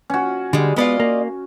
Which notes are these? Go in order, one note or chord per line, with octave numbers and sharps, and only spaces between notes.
C#4 F#4
D3 G3 G#3
G#3 B3 F4 D5 D#5
A#3